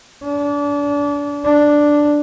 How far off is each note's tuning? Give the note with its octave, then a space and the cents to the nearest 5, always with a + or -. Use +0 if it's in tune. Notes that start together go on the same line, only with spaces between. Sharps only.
D4 -30
D4 +0